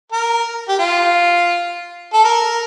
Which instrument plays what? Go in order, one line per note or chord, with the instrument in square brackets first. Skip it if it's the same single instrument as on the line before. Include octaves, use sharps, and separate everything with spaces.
[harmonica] A#4
G4
F4
A4
A#4